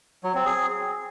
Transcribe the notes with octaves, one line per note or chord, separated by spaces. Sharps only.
F#3
C4
G#4